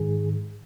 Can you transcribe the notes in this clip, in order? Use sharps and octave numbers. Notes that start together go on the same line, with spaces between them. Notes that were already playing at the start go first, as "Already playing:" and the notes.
Already playing: G#2 D#3 G#4